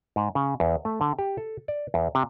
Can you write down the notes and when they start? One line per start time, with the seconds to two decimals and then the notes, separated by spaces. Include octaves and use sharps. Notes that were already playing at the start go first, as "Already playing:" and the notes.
0.16 G#2
0.35 C#3
0.60 E2
0.85 A3
1.01 D3
1.19 G4
1.38 A4
1.68 D5
1.94 E2
2.15 C3